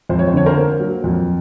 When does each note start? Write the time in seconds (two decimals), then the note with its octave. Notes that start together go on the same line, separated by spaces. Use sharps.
0.09 F2 C5
0.19 C#5
0.28 C5
0.34 D3 C#5
0.46 A#4 C5
0.57 A#3
0.80 F#3
1.04 F2